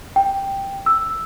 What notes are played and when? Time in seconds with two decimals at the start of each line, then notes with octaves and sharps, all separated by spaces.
0.16 G5
0.86 E6